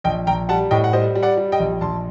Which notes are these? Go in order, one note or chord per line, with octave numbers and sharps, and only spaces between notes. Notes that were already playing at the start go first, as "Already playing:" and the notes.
A#1 D#5 G5
A#1 G5 A#5
G3 F#5 A5
A2 D#5 G5
F#5
G3 C5 D#5
G3
D5 F#5
G3
D#5 G5
A#1
A#1 A5 C6